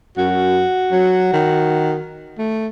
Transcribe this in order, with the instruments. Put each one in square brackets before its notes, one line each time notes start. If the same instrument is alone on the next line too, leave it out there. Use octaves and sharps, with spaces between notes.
[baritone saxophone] F#2 [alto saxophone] F#4
[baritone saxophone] F#3
D#3
A3